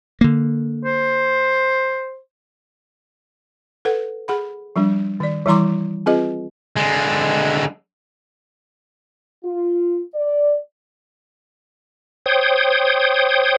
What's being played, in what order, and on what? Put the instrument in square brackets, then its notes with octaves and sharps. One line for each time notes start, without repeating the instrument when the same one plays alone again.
[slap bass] D3 A#3
[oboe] C5
[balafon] A4 B4 F#5
G#4 F#5 B5
F3 G3 D4
D#3 D5
E3 G3 E4 A#5 C6 D6
C4 F4 G#4 B4 D#5
[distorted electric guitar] D3 G#3
[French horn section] F4
D5
[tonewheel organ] C5 C#5 G5 D#6